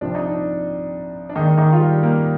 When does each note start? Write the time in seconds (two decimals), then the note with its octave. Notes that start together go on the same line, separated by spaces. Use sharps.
0.01 C2 C3 F3 D4
0.15 D#4
0.29 D4
1.29 D4
1.35 D#2 D#3 G#3 D#4
1.57 D#3 D#4
1.72 F4
1.80 G3 G4
2.03 A#3 A#4